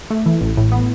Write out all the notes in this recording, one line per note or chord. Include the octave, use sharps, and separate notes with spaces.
A3
E3
A1
A2
B3